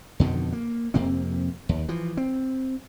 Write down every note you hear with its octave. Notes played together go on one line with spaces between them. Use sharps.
F2 B2 D3 D#3
A#3
F2 C3 A#3 C4
D#2
E3 F3
C4